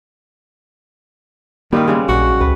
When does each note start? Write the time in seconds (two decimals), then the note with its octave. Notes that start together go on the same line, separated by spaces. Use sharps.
1.73 D#3 G3 A#3 C4 B4
1.88 C#3 G3 G#3
2.09 A#1 F#4
2.41 C#2 B4